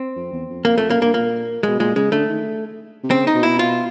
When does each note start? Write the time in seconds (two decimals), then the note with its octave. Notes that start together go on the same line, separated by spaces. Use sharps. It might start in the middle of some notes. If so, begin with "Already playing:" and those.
Already playing: C4
0.16 F2
0.32 E2
0.49 F2
0.65 F2 A#3
0.78 F2 A3
0.90 F#2 A#3
1.02 G2 A#3
1.14 A#2 A#3
1.63 B2 G#3
1.79 A#2 G#3
1.96 C#3 G#3
2.12 D3 A3
2.29 D#3
3.04 C3
3.11 C#3 C4
3.27 D#4
3.34 B2
3.43 E4
3.59 F4